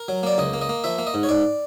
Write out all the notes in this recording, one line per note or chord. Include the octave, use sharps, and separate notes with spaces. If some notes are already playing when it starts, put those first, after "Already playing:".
Already playing: A#4
F#3
A#3 D5
C#2 D#5
A#3
D#5
A#3
F3 E5
A#3
D#5
G#2
C#5
G#2 D5